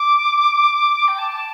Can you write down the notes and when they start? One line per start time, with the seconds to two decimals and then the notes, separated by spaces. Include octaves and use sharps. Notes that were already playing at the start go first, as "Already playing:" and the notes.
Already playing: D6
1.07 G5
1.18 A5